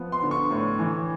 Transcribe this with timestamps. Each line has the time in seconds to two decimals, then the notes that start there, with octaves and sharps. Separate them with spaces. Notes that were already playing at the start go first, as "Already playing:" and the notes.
Already playing: F3 B3
0.12 C6
0.22 D3
0.31 C#6
0.51 A2
0.79 E3